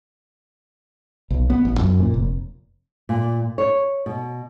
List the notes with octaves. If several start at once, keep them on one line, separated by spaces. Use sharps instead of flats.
B1
B3
A1
F#2
A#2
F1
A#2
C#5
B2